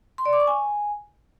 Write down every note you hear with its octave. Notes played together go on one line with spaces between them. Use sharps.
C6
D5
D6
C#6
G#5